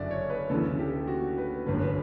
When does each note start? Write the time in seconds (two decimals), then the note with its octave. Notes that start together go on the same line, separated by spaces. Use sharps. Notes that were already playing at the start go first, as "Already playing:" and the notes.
Already playing: F#1 F#2 D3 D5 E5 F#5
0.11 C#5
0.30 B4
0.50 D2 C#3 E3 A4
0.79 G4
1.08 F#4
1.38 B4
1.66 G1 F#2 D3 B4
1.82 B4